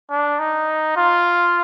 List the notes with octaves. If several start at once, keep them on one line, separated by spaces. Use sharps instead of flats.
D4
D#4
F4